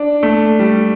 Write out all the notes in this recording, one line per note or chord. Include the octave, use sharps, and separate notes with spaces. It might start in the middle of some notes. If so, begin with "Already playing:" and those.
Already playing: D4
A3
G3